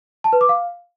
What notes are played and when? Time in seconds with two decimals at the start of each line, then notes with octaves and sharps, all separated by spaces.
0.24 A5
0.33 B4
0.41 D6
0.49 F5